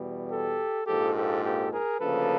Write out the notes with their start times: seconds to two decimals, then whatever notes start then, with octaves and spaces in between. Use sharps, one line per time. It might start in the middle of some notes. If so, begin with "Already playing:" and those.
Already playing: E2 B2 G3
0.30 G4 A4
0.87 A#1 G#2 F3 A#3 G4 A4
1.15 G4 A4
1.43 G4 A4
1.72 G#4 A#4
2.00 D2 C#3 F3 A#3 A4 B4